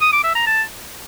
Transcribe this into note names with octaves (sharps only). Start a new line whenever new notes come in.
D#6
D6
E5
A#5
A5